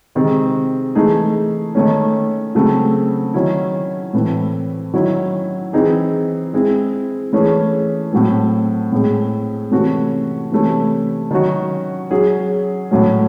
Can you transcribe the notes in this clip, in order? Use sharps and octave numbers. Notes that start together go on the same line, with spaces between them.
C3 D#3 G#3 C4
E3 A3 D#4 G#4
D#3 A3 C#4
C#3 F#3 A3 C4
D#3 F#3 C#4 E4
A2 E3 A3 C4 E4
D#3 F#3 C#4 E4
E3 C4 D#4 G#4
G#3 C4 E4
E3 A3 C#4 G#4
A2 F#3 A3 C4
A2 G#3 C4
C3 E3 A3 C#4 F#4
C3 E3 A3 C#4 E4
D#3 F#3 C#4 F#4
F#3 C#4 G#4
A2 F#3 A3 C#4